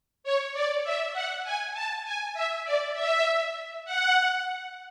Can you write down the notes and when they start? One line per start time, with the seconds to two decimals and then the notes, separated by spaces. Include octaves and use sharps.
0.24 C#5
0.53 D5
0.84 E5
1.13 F#5
1.44 G#5
1.73 A5
2.05 G#5
2.34 E5
2.64 D5
2.94 E5
3.85 F#5